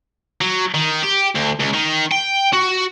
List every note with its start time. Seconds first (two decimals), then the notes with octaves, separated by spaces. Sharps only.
0.41 F#3
0.74 D#3
1.03 G4
1.35 D2
1.60 C#2
1.73 D#3
2.11 G5
2.53 F#4